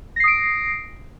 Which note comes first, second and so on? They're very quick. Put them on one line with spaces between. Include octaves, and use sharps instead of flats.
A#6 C7 D#6 D7